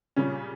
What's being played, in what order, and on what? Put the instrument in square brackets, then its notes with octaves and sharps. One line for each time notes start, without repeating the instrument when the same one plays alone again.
[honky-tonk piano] A#2 C#3 G3 C#4